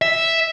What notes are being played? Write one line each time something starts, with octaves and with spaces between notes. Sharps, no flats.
E5